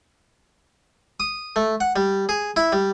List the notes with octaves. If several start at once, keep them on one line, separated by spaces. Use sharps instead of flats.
D#6
A3
F#5
G3
G#4
E4
G3